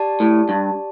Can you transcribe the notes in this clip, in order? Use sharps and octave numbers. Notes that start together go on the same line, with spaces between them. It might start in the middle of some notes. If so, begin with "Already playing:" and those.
Already playing: G4 D5 A5
A2
G2